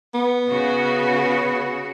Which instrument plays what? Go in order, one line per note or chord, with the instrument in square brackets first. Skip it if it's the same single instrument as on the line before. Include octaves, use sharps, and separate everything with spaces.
[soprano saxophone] B3
[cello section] C#3 F#4